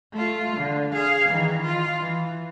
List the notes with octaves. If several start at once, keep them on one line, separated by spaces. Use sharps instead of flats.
A3 F4
D3
G#4 F5
D#3 E3
F4
E3